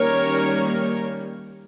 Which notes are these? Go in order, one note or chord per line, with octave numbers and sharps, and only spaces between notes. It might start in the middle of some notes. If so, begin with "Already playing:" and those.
Already playing: D#3 G3 A#3 C#4 A#4 C#5